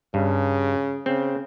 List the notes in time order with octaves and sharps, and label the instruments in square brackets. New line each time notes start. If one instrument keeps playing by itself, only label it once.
[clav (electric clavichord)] G2 [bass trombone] C#3
[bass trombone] C#3 [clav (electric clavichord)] C4